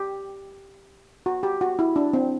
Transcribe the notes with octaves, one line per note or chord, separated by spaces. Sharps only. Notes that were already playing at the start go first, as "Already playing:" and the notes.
Already playing: G4
F#4
G4
F#4
E4
D4
C4